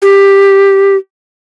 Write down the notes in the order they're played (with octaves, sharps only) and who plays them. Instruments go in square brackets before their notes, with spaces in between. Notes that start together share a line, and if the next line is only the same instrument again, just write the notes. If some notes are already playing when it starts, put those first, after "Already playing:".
[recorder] G4